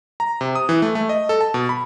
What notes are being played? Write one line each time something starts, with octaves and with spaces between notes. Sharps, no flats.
A#5
C3
D#6
E3
A3
A3
D#5
A4
A5
B2
B5